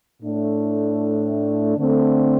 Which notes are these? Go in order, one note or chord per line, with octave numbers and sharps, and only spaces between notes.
A2 A3 D4
D3 A3 C4